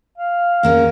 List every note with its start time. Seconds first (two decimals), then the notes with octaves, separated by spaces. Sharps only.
0.18 F5
0.63 G#2 A#3 C#4